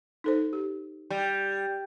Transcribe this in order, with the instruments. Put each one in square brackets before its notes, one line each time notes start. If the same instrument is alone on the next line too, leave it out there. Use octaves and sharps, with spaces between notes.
[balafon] D#4 A4 C5
G4
[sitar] G3